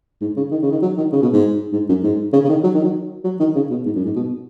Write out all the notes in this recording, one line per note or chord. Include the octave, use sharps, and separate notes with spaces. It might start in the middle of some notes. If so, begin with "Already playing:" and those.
G#2
C#3
D#3
C#3
D#3
F#3
D#3
C#3
B2
G#2
G#2
F#2
G#2
C#3
C#3
D#3
F#3
D#3
F#3
F#3
D#3
C#3
B2
G#2
F#2
G#2
B2